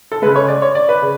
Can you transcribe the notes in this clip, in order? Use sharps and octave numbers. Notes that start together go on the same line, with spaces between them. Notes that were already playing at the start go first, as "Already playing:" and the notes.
A4
C#3 G#3 B4
C#5
D5
C#5
D5
B4
C#3